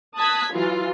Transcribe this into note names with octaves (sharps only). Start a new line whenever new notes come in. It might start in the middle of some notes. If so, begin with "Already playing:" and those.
A5 D#6 F#6 G#6 B6
E3 F#3 F4